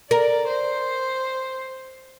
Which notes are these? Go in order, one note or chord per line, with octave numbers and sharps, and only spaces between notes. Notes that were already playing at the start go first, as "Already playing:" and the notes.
A#4 D5
C5